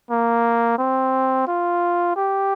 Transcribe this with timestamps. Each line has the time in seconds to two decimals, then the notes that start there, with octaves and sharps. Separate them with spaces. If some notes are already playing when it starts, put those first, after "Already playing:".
0.10 A#3
0.79 C4
1.47 F4
2.16 G4